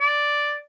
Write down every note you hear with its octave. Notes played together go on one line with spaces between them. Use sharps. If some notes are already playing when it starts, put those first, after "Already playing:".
D5